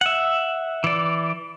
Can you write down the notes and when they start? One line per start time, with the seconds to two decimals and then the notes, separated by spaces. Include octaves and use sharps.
0.01 E5 F#5
0.84 E3 D5